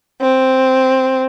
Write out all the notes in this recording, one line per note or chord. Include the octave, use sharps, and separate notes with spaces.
C4